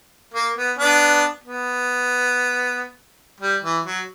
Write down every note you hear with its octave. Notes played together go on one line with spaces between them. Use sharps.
A#3
B3
B3 D4
B3
G3
E3
F#3